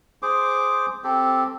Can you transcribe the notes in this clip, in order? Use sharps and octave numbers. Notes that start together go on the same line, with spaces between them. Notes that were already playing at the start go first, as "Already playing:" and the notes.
G#4 C5 D6
C4 G4 A4